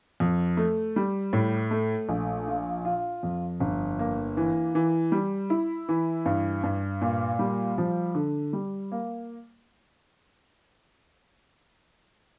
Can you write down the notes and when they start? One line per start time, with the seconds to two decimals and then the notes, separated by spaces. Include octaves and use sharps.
0.20 F2
0.57 A3
0.96 G3
1.33 A2
1.71 A3
2.09 A#1
2.48 F4
2.85 F4
3.23 F2
3.60 G1
3.99 A#3
4.37 E3
4.75 E3
5.12 G3
5.50 E4
5.89 E3
6.26 G2
6.63 G2
7.01 A#2
7.39 G3
7.78 F3
8.15 D3
8.53 G3
8.92 A#3